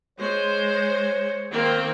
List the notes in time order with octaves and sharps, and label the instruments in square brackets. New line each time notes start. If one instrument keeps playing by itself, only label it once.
[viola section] G#3 C5 [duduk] C#5
[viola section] D#3 A#3 C4